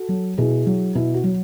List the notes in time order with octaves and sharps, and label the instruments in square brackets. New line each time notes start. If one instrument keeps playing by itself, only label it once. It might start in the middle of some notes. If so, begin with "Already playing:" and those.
Already playing: [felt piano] F#4 A4
F#3
B2 E4 G#4
F#3
B2 E4
F#4
F#3